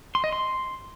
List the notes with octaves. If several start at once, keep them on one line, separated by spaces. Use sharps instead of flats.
C6
D#5
C6